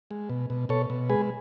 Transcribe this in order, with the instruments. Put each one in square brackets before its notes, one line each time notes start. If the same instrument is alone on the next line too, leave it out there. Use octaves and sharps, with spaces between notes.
[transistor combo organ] G#3
B2
B2
B2 A4 C#5
B2
G#3 G#4 B4